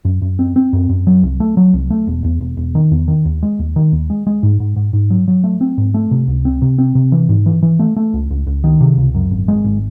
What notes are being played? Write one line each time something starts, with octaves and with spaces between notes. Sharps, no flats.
F#2
F#2
C4
C4
F#2
F#2
F#3
C2
A3
F#3
C2
A3
E1
E2
E1
E1
D#3
E2
D#3
D#2
G#3
D#2
D#3
D#2
G#3
G#3
G#2
G#2
G#2
G#2
F#3
F#3
A3
C4
G#2
A3
C3
C#2
C4
C3
C4
C3
E3
G#2
E3
E3
A3
A3
C#2
C#2
C#2
D#3
C3
C#2
F#2
G#1
G#3
G#1